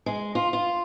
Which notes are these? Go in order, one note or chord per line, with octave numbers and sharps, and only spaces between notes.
G#3
F4
F4